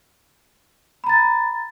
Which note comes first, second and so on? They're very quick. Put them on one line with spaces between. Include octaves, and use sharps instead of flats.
B5 A#5 A6